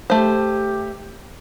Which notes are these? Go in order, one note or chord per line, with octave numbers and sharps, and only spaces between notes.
A3 G4 C5